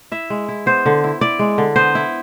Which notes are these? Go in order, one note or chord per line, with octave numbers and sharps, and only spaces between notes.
E4 E5
G#3
E4
B3 C5
D3
E4
E4 D5
G#3
D3
B3 C5
E4